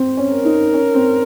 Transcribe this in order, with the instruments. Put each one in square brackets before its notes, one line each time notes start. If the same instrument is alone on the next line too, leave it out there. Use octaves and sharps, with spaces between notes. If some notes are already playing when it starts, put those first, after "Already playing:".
Already playing: [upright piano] C4
C#4
[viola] A#4
[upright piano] D#4
C#4
C4